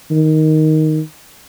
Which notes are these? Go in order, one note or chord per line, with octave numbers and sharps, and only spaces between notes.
D#3